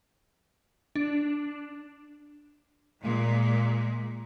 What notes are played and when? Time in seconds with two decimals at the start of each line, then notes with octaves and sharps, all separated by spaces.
0.96 D4
3.02 A#2 G#3